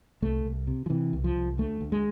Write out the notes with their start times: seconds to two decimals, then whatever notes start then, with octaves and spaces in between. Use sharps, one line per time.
0.22 C2 A3
0.45 C2
0.67 C3
0.86 F3
0.90 C3 E3
1.13 C2
1.24 F3
1.36 C2
1.58 D2 A3
1.81 D2
1.92 G#3